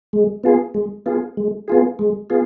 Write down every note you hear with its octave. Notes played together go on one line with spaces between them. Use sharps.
G#3
B3 F4 G#4
G#3
B3 F4 G#4
G#3
B3 F4 G#4
G#3
B3 F4 G#4